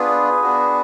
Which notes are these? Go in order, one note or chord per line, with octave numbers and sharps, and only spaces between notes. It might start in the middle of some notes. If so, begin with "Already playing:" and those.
Already playing: B3 D4 F4 G#4 B4
B3 D4 F#4